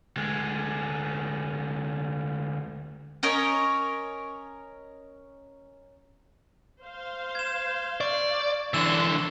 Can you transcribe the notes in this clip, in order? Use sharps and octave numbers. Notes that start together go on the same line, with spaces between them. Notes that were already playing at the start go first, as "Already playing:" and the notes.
D2 G#3
C#4 A#4 C#5 D#5
C5 F5
G#6 E7
D5 C#6
D3 E3 D4 C6 E6 E7